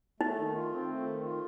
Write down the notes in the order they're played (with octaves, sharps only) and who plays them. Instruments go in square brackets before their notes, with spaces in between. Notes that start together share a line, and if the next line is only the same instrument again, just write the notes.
[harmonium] A3 [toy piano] D#4
[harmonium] D#3
F4
C4
A3
D#3
F4